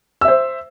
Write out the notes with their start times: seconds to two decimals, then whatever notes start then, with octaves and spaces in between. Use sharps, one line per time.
0.21 E6
0.25 E5
0.28 C5